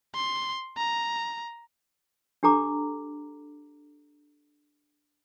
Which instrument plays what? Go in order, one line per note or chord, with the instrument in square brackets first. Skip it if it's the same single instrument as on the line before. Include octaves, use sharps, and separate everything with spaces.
[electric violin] C6
A#5
[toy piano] D4 G4 A4 A#5 D6